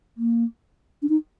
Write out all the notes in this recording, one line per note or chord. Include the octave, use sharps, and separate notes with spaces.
A#3
D4
D#4